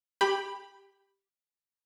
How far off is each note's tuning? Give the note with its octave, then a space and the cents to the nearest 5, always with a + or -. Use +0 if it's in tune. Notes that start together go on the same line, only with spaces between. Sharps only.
G4 +0 G5 +25 B5 +0